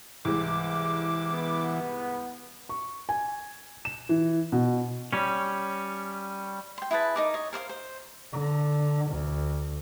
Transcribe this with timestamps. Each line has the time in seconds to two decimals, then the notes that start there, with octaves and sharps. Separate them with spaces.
0.25 C2 G#2 E3 D6
1.32 B3
2.69 C#6
3.09 G#5
3.85 E7
4.09 E3
4.52 B2
5.13 G3 C#4
6.78 G5 C6
6.91 E4 G#4 B4 A5
7.16 D#4 A#4 D6
7.34 C#5 D#5
7.53 A#4 C5 D5 F5
7.69 C5
8.32 D3
9.12 D2